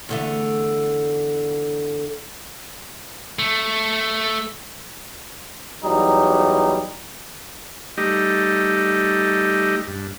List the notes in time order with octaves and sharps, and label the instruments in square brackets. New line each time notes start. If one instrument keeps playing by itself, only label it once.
[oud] E2 D3 A3
[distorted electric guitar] A3
[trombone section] E2 F#3 G3 D#4
[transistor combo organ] G3 A3 D#4 G4 D#5
G2